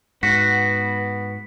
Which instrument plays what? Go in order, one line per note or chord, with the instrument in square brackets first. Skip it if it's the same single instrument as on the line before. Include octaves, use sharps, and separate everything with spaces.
[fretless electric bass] G#2 [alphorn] B3 [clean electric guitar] F#4 [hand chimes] B6